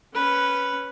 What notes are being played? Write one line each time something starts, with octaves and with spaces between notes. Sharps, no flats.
C#4 B4